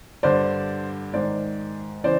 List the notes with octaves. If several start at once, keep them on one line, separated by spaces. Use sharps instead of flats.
G2 D3 C5 D5
G#2 D#3 C5 D5
C#3 E3 C5 D5